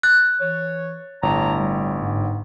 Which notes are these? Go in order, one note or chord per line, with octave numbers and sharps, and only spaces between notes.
F#6 A6
E3 C#5
G1 A2 C#5 A5 A#5
G3
G#2